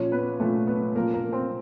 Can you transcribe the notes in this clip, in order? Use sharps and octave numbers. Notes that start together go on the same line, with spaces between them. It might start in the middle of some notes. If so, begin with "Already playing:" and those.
Already playing: A#2 F3 C#4 C#5
B3 B4
A#2 F3 A3 A4
B3 B4
A#2 F3 A#3 A#4
A#3 A#4
C4 C5